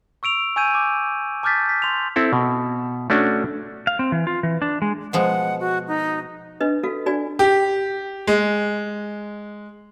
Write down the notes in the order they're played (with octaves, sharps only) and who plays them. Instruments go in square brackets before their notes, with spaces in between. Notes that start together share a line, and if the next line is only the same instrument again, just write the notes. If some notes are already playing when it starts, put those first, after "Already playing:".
[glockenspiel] C#6 E6 D7 F7
G#5 C#6 E6 G6 G#6 D#7
D6
A5 D6 F6 G6 A6 B6
B6
C6 F7
[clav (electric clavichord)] C4 E4 A4
B2
A3 C#4 D4 F#4
[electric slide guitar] F5
C4
E3
F4
E3
D4
G#3
[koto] B2 F3 G#3 [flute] F#5
[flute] F#4
D#4
[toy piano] D4 B4 D#5
F#4 A4 F5
D4 F#4 D5 G#5
[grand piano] G4
G#3